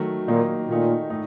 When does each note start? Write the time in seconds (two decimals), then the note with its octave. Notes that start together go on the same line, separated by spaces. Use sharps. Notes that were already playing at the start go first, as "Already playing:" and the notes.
Already playing: D#3 F#3 A3
0.28 A#2 D#3 F#3 A#3 D#4
0.69 A#2 D#3 A3 D#4
1.10 A2 A3 D#4